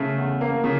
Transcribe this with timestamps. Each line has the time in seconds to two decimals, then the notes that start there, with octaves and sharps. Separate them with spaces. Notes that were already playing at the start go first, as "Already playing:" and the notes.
Already playing: C#3 A3
0.17 E2
0.41 A#3
0.64 C#3